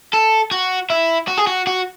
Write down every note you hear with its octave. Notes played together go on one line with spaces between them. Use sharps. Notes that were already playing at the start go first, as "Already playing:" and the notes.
A4
F#4
E4
F#4
G#4
F#4
F#4